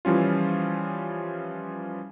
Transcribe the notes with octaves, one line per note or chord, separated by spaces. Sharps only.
E3 F3 G3 C#4 F4